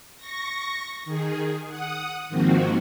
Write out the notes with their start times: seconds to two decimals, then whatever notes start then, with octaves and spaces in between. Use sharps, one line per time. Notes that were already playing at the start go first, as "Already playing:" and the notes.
0.17 C#6 A#6
1.05 D#3 G#4
1.68 F#5 D#6
2.29 G#2 D#3 F3 A#3 C4 F#4